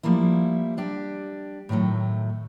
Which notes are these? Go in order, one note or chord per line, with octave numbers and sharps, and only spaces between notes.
F3 G3 A3 A#3 E4
G3 D4 G4
A2 D#3 E3 F#3 A3